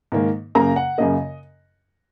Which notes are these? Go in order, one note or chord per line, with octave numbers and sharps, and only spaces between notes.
G#2 D#3 A#3
F#2 C#3 A#3 A#5
F#5
F#2 C#3 A#3 D#5